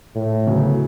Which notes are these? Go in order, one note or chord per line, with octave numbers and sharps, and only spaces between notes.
A2
D2 C#3 F#3 B3